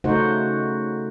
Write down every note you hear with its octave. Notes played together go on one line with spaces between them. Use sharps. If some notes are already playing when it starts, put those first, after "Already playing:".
C#3 A3 D#4 F#4 C5 F#5